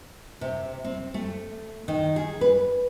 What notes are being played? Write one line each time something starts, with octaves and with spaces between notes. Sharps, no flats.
C3
C4
A3
D#3
G#4
B4